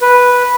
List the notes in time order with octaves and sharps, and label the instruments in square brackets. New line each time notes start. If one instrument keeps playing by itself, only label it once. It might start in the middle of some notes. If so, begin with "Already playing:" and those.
[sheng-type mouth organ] B4